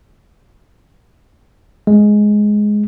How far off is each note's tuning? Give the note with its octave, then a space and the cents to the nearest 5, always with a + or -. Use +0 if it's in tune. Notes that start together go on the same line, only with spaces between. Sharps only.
G#3 +10